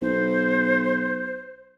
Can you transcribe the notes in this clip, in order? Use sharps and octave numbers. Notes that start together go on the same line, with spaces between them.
B1 C5